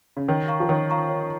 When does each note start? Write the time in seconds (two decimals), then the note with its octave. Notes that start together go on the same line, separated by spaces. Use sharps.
0.17 C#3
0.29 D#3 C#5
0.48 F5 A#5 C#6
0.60 F3
0.69 D#3 C#5
0.90 F5 A#5 C#6
1.09 C#5